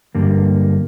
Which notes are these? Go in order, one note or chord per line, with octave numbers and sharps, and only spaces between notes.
G2 D3 G3 A#3